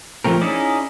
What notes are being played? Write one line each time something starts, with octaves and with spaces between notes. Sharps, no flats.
F3 A3 C4 A#4
C#4 D#4 E4 G#4 D5